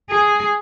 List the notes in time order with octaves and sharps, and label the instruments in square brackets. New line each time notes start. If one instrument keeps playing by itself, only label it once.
[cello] G#4